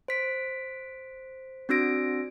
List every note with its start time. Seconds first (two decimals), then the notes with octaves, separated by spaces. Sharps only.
0.08 C5 B6 D7
1.69 C4 D4 F#4 E6 A#6 D7